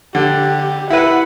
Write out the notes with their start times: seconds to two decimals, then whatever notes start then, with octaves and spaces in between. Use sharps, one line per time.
0.15 D3 G4
0.90 E4 B4 F#5